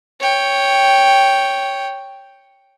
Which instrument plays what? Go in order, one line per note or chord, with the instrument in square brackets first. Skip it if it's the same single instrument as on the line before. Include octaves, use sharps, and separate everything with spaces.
[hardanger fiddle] C#5 G5